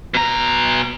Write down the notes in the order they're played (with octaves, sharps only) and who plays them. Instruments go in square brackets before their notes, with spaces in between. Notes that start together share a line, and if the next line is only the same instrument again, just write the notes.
[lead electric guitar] B2 A#5